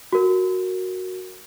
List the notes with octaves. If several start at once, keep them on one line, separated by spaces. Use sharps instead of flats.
F#4 A#4